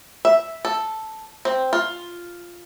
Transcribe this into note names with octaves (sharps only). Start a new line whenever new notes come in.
E5
A4
C4
F4